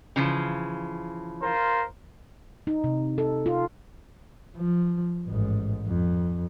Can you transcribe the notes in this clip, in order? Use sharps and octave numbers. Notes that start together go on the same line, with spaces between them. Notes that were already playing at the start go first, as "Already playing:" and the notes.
C#3 E3 F3
F4 A#4 C5
D#4
C3
A4
F4
F3
A1 G#2
F2